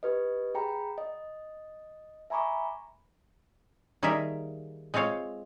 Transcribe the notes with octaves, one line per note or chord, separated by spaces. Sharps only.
G4 B4 D#5
G#4 G5 A#5 B5
D#5
E5 G#5 A#5 B5 C#6 D6
D#3 G3 A#3 G#4 A#4 E5
G#3 C4 F4 C#5 F5